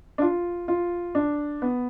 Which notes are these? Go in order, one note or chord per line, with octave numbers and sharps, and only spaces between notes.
D4
F4
F4
D4
B3